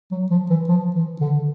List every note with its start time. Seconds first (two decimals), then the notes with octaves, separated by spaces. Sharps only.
0.11 F#3
0.31 F3
0.50 E3
0.68 F3
0.95 E3
1.21 D3